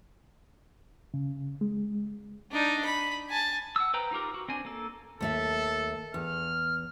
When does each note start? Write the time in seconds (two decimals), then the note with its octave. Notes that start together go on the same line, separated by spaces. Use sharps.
1.14 C#3
1.61 G#3
2.51 D4 D#4
2.84 B5
3.30 G#5 A5
3.76 F#5 E6
3.94 B4 C5 G5 A#5
4.11 D#4 F4 G4 A#4
4.34 F#4
4.48 C4 D4 G#5
4.65 A#3 A4
5.21 D#2 A3 A4 E5
6.14 E2 F6